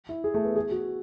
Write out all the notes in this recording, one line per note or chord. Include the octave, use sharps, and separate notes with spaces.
E4
G#4
A3
B3
G#4
F#4